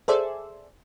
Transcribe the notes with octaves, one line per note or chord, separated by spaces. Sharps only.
G#4 A4 C5 D5 E5